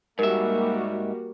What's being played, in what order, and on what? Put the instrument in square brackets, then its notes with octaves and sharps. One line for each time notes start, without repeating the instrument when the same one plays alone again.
[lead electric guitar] G#2 E5 [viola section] G3 A#3 F#4 [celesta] A#4